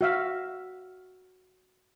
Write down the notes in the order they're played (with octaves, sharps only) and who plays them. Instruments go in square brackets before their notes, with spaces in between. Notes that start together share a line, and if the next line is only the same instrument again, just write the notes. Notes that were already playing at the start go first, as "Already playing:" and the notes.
[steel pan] F#4 E5 F5